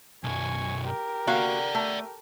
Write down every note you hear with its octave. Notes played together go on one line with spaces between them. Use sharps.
B1 F#2 G#5 C#6
G4 A#4
A#3 F#4 D5 F5 F#5
A3